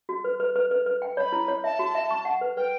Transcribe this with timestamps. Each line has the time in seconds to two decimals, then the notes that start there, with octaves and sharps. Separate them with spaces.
0.09 F#4
0.24 B4
0.40 B4
0.56 B4
0.71 B4
0.86 B4
1.02 G5
1.17 C#5 B5
1.32 E4
1.48 C#5
1.64 E5 A5
1.79 F#4
1.95 E5
2.11 C#6
2.25 F#5
2.41 B4
2.57 B4 G5